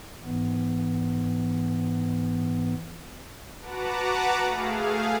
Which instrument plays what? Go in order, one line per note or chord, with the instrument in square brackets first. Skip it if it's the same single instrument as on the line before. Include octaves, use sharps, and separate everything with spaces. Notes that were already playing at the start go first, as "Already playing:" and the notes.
[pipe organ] G#2 E3 B3
[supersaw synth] F#4 B4 F#5 A5 A#5 D6
A3 G#4 F5